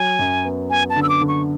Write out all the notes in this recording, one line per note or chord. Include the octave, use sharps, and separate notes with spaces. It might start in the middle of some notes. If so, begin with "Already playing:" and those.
Already playing: F#3 G#5
F#2
B3
B3 G#5
A5
D3
E6
D6
D3
C#6